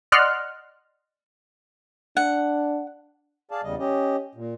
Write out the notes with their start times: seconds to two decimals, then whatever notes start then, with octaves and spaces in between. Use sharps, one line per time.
0.12 D5 D#5 F#5 C6 F6 F#6
2.17 D4 F#5
3.51 G#4 D5 F5 A5
3.63 E2 C#3 G3 D#5
3.79 C#4 G4 D#5
4.35 A#2